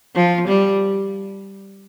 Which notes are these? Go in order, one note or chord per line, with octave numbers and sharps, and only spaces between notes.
F3
G3